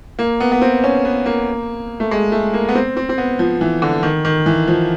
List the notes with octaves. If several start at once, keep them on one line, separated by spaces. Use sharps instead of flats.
A#3
B3
B3
C4
C#4
B3
A#3
A3
G#3
A3
A#3
B3
C4
C4
C4
B3
F3
E3
D3
D#3
D#3
E3
F3